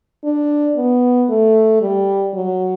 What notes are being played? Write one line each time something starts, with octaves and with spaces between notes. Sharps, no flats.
D4
B3
A3
G3
F#3